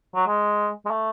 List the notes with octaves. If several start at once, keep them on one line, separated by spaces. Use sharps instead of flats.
F#3
G#3
G#3
A3